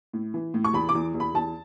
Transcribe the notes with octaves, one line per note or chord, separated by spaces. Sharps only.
A2
E3
A2
C#6
E2 B5
D6
E2
E2
B5
E2 A5